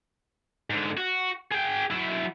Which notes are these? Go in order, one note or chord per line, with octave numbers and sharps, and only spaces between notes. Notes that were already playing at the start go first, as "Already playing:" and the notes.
G#2 D3
F#4
G#4 G5
F#3 E4